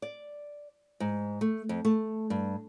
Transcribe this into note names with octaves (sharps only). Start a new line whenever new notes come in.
D5
G#2
A3
F2
A3
G2